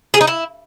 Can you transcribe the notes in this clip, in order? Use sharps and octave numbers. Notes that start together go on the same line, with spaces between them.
G#4
D#4
E4